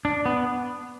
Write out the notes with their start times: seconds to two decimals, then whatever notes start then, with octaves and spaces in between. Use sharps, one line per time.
0.05 D4
0.26 B3